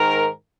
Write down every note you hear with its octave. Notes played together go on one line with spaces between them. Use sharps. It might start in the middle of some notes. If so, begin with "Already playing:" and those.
Already playing: G#2 D#3 A#4